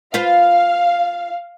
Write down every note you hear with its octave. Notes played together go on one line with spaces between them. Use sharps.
F4 B4 C5 F5